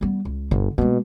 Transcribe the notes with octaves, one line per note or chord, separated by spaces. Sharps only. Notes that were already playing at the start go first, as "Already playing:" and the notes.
G3 B3
C#2
G1 D3
B2 G#3 A#3